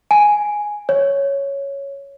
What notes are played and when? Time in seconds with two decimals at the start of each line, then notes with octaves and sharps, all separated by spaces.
0.11 G#5
0.89 C#5